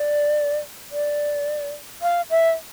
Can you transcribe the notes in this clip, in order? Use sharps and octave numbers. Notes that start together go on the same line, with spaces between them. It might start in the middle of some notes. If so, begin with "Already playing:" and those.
Already playing: D5
D5
F5
E5